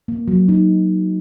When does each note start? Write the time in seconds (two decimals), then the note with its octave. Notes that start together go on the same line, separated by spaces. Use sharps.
0.08 A#3
0.28 F#3
0.49 D#4